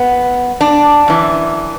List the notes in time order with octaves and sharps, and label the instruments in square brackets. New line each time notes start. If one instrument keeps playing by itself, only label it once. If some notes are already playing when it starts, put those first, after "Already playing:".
Already playing: [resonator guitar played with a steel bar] B3
D4
F#2 E3